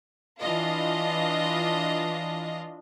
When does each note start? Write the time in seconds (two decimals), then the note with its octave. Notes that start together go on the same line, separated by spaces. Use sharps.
0.41 E3 D4 F4 D#5